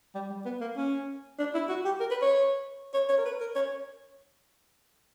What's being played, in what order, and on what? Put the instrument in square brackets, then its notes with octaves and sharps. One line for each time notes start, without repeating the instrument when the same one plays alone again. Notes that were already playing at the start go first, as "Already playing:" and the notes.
[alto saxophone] G3
G3
B3
A#3
C#4
D4
E4
F#4
G4
A#4
B4
C#5
C#5
C#5
A#4
B4
A#4
C#5